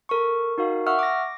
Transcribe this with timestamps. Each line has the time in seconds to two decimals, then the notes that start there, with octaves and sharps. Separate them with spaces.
0.09 A4 A#4 C#6
0.58 D#4 F#4 A#4 F5
0.87 E5 F#5 C#6 E6 F6
0.99 D6 A#6